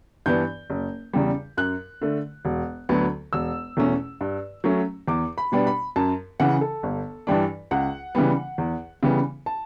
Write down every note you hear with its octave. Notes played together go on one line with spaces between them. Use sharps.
G2 E3 B3 D4 G6
F#1
E2 C#3 G3
F#2 F#6
D3 A3
E1
D2 D3 F#3 B3
E1 E6
E2 B2 A3 C#4
G2
F#3 A3 C#4
E2 D6
B5
B2 G3 B3 D4
B5
F#2 A5
C#3 E3 F#5
A4
G1
G2 E3 G3 D4
C#2 F#5
C#3 E3 G3 B3
E2
C#3 E3 G3 B3
A5